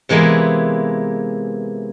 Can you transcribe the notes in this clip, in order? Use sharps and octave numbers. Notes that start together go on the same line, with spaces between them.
C3 E3 G#3 A#3 B3